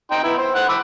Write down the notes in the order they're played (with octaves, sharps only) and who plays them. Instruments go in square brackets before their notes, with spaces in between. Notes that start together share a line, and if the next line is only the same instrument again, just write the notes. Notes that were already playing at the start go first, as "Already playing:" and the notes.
[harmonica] D#4 G5 C6
B3 E4
C5
C5 F#5
B5 D6 E6